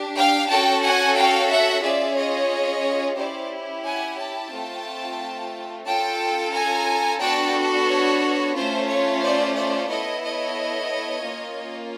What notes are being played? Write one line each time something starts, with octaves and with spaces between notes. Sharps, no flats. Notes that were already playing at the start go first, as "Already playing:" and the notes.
Already playing: D4 G4
F5 G5
C#4 F#4 A4 G5 A5
F#5 G#5
F5 G5
E5 F#5
C#4 F4 G#4 D5 E5
C#5 D#5
C#4 E4 G4 C5 D5
F#5 G#5
G5 A5
A3 C4 F4
C#4 F4 A4 G5 A5
G#5 A#5
B3 D4 F#4 A4 G5 A5
C#5
A3 C#4 F4 C5
C#5
C5 D5
C5 D5
B3 E4 A4 C#5 D#5
C#5 D#5
A#3 C#4 F4